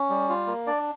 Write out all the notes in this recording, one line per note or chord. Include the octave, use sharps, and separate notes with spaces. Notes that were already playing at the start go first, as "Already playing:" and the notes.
Already playing: C#4
G3
F4
A#3
D4 D5